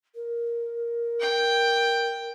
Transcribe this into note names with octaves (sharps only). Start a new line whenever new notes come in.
A#4
G5